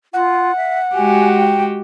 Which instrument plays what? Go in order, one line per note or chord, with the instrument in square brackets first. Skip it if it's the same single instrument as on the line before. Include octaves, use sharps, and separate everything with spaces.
[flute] F4 [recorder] F#5
[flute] E5
[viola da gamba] G#3 F#4 G4 [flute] G#5
[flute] G5